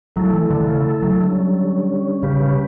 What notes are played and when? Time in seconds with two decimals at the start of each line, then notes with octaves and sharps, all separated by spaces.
0.16 F#3 A3 E4 A4
0.33 E3
0.50 D3
0.68 C#3
1.02 F#3
1.20 D3 G3 C#4
2.23 C#3 G3 C#4 G4 B4
2.41 C#3